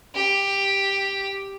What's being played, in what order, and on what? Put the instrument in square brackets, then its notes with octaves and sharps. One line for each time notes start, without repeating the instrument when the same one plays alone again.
[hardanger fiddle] G4